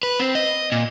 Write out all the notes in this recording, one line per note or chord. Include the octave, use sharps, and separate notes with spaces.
B4
C4
D#5
A#2